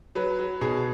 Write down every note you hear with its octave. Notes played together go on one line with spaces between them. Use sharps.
F#3 B4
F#3
B2 G#4